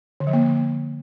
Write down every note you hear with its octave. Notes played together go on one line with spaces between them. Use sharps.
D3
F3
A#3